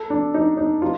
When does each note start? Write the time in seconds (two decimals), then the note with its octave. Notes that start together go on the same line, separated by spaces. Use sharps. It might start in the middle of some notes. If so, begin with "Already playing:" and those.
Already playing: A4
0.10 D4
0.34 D#4
0.57 D#4
0.82 F4